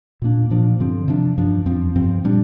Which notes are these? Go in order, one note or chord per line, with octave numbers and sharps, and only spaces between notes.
A#2 A#3 D4
A#2 F3 A#3 D4
G2 D3 F3 C4
C3 F3 D4
G2 F3 D4
F2 F3 C4
G2 F3 C4
A#2 G3 D4